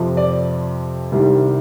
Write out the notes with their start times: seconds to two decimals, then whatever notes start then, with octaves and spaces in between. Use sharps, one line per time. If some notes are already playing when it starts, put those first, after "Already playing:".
Already playing: F2 C3 F3
0.17 D5
1.12 C2 C3 D#3 G3